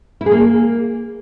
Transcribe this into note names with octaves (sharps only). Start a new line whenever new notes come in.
E4
G#4
A#3